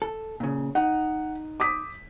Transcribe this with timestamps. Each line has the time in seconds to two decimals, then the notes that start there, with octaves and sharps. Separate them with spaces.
0.02 A4
0.40 A#2 C#3
0.75 D#4 F#5
1.60 D6 D#6 B6